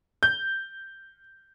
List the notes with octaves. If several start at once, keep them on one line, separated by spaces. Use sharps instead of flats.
G6